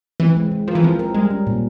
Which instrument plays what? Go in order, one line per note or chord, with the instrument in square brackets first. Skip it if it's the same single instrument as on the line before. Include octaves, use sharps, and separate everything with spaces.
[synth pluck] E3 [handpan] C4
[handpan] G#3
G#3
[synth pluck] F3 [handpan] A#4
[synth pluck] E3
[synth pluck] F3 [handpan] C4
[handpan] A#4
[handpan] G3 [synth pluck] G#3
[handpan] C#4
A#2